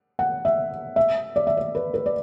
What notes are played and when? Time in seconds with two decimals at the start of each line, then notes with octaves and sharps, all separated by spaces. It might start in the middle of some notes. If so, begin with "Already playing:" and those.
0.19 F#5
0.45 E5
0.96 E5
1.36 D5
1.47 E5
1.57 D5
1.75 B4
1.94 B4
2.06 D5